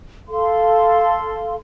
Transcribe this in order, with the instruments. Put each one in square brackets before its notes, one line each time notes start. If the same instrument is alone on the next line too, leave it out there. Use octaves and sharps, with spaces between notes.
[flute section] A4 F5 C6